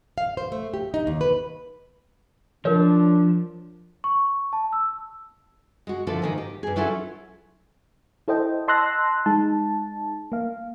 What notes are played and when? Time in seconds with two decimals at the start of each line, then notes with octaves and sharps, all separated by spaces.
0.18 F5
0.37 C5
0.52 A3
0.74 G4
0.94 D#4
1.07 D#2
1.21 B4
2.65 F3 D4 A#4 C#5
4.04 C#6
4.53 A5
4.73 E6
5.87 G#3 F#4
6.07 D3 F3 A#3 E4 A4
6.22 G#2 D#3 A#3
6.38 G4
6.63 G2 G#4
6.76 F#3 C#4 E4 F4 A4
8.28 E4 A4 C5 D#5 G5
8.68 D#5 A5 C6 E6 F#6 A#6
9.26 G#3 D#4 A5
10.32 A#3 F5